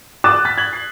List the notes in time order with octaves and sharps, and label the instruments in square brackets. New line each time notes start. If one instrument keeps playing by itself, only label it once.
[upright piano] D6 D#6 F#6 A6 D#7 E7
F6 A6 B6
G#6 F#7
C7